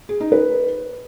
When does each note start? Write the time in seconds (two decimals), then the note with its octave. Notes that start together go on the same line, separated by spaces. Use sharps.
0.09 G#4
0.20 D#4
0.32 B4